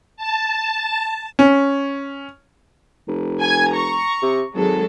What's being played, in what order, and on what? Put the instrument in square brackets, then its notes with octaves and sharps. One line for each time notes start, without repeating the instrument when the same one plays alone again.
[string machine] A5
[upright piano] C#4
[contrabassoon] F1
[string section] G#5 G#6
A#5 C#6
[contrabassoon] C3
[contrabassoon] G#1 [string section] F#3 G#3 A4